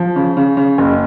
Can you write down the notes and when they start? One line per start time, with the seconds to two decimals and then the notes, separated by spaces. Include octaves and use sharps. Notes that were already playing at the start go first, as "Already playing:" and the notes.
Already playing: F3
0.16 C#3
0.37 C#3
0.57 C#3
0.78 F#1